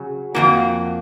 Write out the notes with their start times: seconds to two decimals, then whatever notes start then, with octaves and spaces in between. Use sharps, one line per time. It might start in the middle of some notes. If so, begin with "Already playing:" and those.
Already playing: C#3 F#3
0.35 F2 D#3 A#3 F#4